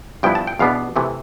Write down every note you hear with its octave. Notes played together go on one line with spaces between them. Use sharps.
G2 F3 B3 E4 G5
A5
G5
E2 B2 B3 D4 F5
C3 E3 A3